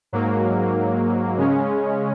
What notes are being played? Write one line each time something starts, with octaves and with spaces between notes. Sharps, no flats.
G#2 F#3 A#3
C#3 G#3 C#4